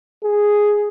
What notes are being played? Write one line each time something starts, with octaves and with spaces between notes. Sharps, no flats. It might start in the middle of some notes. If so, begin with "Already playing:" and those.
G#4